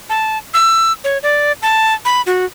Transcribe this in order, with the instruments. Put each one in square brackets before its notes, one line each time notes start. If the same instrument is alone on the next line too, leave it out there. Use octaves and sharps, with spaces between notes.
[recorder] A5
E6
C#5
D5
A5
B5
F#4